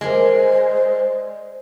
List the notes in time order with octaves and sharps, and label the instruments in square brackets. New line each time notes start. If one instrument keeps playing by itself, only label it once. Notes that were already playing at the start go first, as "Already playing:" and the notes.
[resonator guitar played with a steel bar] G#3 [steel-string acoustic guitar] A#4 D5 D#5 [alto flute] C5